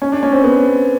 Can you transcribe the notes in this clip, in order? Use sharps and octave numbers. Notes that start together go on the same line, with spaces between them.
C#4
D4
C#4
C4
B3